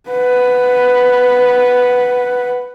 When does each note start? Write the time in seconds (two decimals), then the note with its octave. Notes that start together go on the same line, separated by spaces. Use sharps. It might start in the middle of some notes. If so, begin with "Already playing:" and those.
0.10 B4 F#5